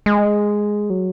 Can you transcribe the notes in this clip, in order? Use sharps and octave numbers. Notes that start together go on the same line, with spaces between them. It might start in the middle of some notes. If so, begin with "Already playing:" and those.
G#3
F#3